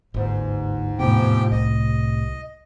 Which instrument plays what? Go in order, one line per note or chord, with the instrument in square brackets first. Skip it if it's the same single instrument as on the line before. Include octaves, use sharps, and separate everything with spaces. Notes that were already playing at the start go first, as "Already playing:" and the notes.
[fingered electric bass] G1 D2 [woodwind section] G#2
[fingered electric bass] E2 A#3 B3 [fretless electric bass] A2 C3 [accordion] F3 G4 G5
[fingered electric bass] C2 [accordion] D#5